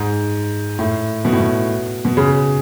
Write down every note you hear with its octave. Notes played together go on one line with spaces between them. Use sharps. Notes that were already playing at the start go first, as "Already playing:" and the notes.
Already playing: G#2
A2
B2
A2
B2
B2
C#3